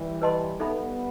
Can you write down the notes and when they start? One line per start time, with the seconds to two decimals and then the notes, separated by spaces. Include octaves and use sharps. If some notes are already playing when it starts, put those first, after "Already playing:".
Already playing: E3 G3
0.22 B4 D#5 A5 C6
0.59 G3 B3 D#4 A4 E5 B5